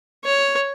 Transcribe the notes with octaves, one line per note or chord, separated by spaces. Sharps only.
C#5